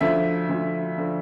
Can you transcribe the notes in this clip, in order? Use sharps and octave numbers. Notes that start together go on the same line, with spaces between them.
D2 D3 F3 E5
D2 D3 F3
D3 F3